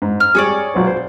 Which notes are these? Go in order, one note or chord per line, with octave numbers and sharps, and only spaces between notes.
G#2
F6
G3 G#4 C#5 D5
B1 F4 C5
C5